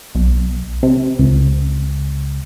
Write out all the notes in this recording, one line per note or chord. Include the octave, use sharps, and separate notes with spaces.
B1
C3
C#2